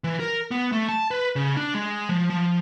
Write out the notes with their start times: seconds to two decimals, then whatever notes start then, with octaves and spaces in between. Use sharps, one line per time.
0.04 E3
0.20 A#4
0.51 B3
0.72 A3
0.89 A5
1.11 B4
1.36 C#3
1.57 D4
1.74 G#3
2.09 F3
2.30 F3